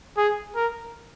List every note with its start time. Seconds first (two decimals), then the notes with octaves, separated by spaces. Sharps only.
0.17 G#4
0.56 A#4